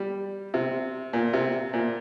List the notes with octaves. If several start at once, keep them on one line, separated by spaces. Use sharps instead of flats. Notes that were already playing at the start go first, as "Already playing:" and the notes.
Already playing: G3
C3
A#2
C3
A#2